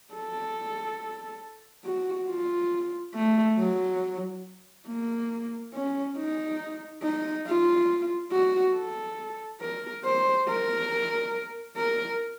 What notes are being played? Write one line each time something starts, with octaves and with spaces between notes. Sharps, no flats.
A4
F#4
F4
A3
F#3
A#3
C#4
D#4
D#4
F4
F#4
A4
A#4
C5
A#4
A#4